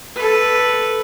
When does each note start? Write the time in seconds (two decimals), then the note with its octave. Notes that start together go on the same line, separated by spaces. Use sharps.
0.16 A4 B4